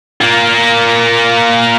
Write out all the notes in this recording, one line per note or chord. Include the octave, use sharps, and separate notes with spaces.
A#3 F4